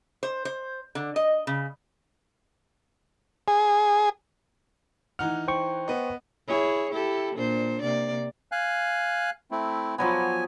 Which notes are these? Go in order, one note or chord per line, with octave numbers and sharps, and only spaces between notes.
C5
C5
D3
D#5
C#3
G#4
E3 D#4 F#5 F6
C5 G5 C#6
B3 D#5
E4 G#4 C#5
E4 G4 A4
A#2 D4 C5
C3 A#3 D5
F5 G#5 F#6
A3 C4 E4
F3 F#3 B3 G#5